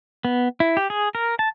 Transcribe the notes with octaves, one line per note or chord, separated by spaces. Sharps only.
B3
E4
G4
G#4
A#4
A5